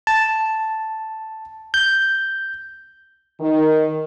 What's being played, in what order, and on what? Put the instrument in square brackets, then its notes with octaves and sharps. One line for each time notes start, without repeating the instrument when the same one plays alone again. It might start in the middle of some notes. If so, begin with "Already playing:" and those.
[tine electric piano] A5
G6
[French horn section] D#3